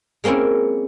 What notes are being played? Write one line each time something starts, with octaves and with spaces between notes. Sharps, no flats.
G#3 A#3 C4 C#4 E4